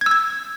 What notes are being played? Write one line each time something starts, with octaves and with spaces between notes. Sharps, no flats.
G#6
E6
G#6